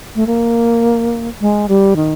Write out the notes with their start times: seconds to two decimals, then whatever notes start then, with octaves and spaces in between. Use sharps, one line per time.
0.16 A3
0.27 A#3
1.41 G#3
1.69 G3
1.96 D#3